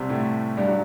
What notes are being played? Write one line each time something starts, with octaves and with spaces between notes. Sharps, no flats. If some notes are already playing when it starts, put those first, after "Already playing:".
Already playing: C2 C3
A2 A3
G2 G3
F#3